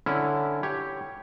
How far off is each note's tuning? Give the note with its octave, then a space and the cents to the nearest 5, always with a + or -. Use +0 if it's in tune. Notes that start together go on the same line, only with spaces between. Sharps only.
D3 +0 C#4 +0 E4 +0
G4 +0 C#5 +0